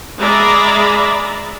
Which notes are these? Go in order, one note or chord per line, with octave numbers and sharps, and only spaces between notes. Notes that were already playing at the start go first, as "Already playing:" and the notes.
G#3 D5 E5 A#5 B5